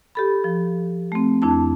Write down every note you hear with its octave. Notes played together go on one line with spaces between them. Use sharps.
G4 A4 B5
F3
A3 C4
F2 D4 E4 A5